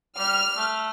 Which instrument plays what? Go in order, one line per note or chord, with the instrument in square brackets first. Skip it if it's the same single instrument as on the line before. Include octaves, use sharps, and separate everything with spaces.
[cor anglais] G3 [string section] F6
[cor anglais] A3